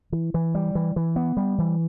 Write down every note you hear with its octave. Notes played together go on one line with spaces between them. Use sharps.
E3
E3
G3
E3
E3
B3
G3
E3